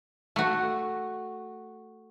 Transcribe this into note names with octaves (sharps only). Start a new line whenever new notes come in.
A3 F#4